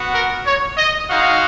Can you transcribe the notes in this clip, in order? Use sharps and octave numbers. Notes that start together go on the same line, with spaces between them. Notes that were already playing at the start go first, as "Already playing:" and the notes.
Already playing: B3 F#4
A#4
C#5
D#5
G#3 D#4 F#4 F5